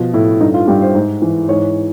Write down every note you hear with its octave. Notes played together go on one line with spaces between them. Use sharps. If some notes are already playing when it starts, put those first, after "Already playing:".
Already playing: B2 F3
A2 E4
G2 D#4
F4
G2 G4
C5
G#2
E3
G#2 C#5